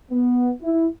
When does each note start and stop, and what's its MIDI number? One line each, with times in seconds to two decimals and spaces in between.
0.11 0.51 59
0.62 0.86 64